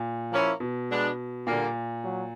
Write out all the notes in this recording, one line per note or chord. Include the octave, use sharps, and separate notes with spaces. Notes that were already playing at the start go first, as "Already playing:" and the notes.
Already playing: A#2
F3 A#3 C#4 E4
B2
G#3 B3 D4
A#2 D3 G3 A#3
F#3